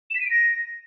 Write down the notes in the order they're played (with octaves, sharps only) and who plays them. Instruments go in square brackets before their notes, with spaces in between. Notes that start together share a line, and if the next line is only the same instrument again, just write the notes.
[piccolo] E7
B6
D#7
D7
A#6